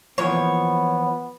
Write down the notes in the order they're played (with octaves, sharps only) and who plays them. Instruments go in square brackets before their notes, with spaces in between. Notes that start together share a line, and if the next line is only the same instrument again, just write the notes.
[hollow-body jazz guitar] E3 F3 A#3 [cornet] B3 [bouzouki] C#5